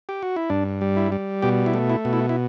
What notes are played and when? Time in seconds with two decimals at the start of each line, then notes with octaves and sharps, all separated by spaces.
0.09 G4
0.23 F#4
0.36 E4
0.50 G2 D4
0.81 G3
0.97 E4
1.12 G3
1.42 B2 G4
1.66 E4
1.74 A3
1.90 E4
2.05 B2
2.13 E4
2.29 E4